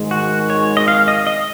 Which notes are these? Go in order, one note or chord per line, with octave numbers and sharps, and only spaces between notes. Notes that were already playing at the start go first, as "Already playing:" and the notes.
Already playing: G#1 G#2 D#3 G#3
F#4
C#5
D#5
F5
D#5
D#5